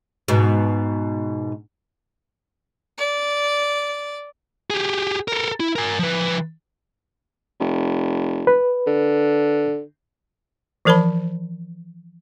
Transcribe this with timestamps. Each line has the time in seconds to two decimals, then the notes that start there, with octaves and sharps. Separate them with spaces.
0.28 G#2 B2
2.97 D5
4.70 G4 G#4
5.28 A4 A#4
5.60 E4
5.76 A#4 G#5
5.99 F3 B4
7.60 F1
8.47 B4
8.87 D3
10.85 E3 F3 A#4 C5 A5 B5